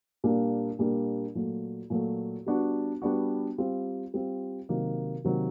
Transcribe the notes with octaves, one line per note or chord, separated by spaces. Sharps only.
A#2 G3 A#3 D4
A#2 G3 A#3 D4
A#2 F#3 A3
A#2 F#3 A3
G3 B3 D4 F#4
G3 B3 D4 F#4
G3 C4 F4
G3 C4 F4
C3 D#3 F#3 A#3
C3 D#3 F#3 A#3